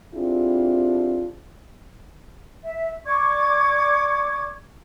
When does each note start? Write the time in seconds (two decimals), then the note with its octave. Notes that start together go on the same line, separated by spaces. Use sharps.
0.14 C4 D4 E4 F4 G4 G#4
2.64 E5
3.05 D5 C#6 D6 G#6